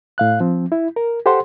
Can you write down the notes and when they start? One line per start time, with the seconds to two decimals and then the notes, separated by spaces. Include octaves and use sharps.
0.18 A2 F5 F#6
0.40 F3 C4
0.72 E4
0.96 A#4
1.26 G4 A4 C5 F#5 C6